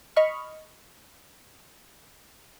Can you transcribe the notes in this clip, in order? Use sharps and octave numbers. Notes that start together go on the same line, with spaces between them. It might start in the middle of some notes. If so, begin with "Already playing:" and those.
D#5 B5 C#6 F6